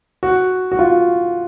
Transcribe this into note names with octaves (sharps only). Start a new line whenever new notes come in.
F#4
F#4
F4